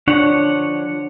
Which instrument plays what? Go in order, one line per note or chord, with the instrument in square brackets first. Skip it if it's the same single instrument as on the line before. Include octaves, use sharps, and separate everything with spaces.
[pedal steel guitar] F3 C#5 F#5 [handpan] D4